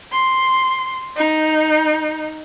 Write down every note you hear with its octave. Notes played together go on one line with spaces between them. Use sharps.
C6
D#4